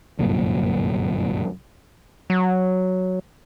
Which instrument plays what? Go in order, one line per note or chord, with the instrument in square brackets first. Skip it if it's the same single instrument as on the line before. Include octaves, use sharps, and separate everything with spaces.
[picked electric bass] G1 C2 F#2 A#2
[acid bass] F#3